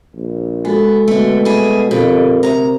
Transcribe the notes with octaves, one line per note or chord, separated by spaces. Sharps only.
A#1
G#3 B3 F#4 A4
B2 D3 A3
G3 E4 G#4
F2 B2 D3 G4 A#4
D2 G2 C3 A#5